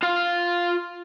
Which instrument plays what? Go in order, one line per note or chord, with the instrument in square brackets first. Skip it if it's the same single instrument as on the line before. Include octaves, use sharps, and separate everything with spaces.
[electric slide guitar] F4 F5